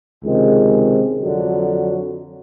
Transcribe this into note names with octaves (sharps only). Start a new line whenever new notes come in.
C#2 C3 D#3 G#3
F2 D3 F#3